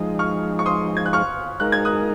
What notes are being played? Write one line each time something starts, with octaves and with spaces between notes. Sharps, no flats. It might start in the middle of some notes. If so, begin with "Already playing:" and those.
Already playing: F3 G#3 D#4 D#6
C#6 F6
C#6
C6 D#6
G#6
F#6
C#6 F6
G#3 D#4 A#4 F#6
G#6
D#6 F#6